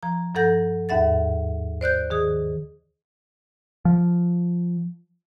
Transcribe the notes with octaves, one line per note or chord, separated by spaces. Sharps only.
F3 A#5
G2 F3 A4 F#5 G6 A#6
D#2 G#2 E5 F#5 A6
C5 D5 F#6 G6
D#3 G#4 D#6
F3